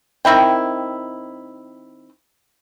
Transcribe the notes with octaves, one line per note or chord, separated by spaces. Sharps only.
D#3 C4 E4 G5